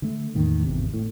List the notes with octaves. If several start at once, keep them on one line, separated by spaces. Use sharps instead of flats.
D3 A3
E2 A2 D#3 A#3
G#1 E2 C3
A2